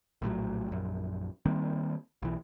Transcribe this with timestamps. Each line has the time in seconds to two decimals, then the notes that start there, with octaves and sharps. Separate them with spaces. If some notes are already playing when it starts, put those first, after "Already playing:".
0.22 A#1 A2 F3 F#3
0.68 A#1 F#2
1.46 D#3 G3 A#3 C4
2.22 B1 E3